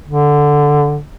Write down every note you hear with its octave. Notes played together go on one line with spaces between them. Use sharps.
D3